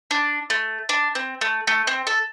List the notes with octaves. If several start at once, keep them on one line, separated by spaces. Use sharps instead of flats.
D4
A3
D4
C4
A3
A3
C4
A4